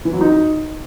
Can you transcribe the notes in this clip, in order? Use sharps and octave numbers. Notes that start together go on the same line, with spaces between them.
E3
F#3
D#4